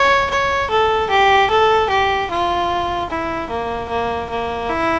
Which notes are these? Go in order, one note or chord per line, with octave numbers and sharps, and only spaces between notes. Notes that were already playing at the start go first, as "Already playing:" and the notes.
Already playing: C#5
C#5
A4
G4
A4
G4
F4
E4
A#3
A#3
A#3
E4